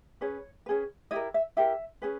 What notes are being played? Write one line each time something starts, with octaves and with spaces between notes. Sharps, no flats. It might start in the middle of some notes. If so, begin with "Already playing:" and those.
C#4 G#4 B4 C#5
C#4 G#4 B4
E4 G4 A#4 D#5
E5
E4 G4 A#4 E5
C#4 G#4 B4